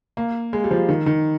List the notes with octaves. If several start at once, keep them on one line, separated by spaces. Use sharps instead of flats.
A#3
G#3
G3
F3
D#3
D#3